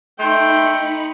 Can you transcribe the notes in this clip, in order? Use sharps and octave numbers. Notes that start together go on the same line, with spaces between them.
A3 D#4 G5 B5 C6 C#7